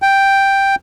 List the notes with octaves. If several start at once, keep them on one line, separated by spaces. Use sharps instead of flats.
G5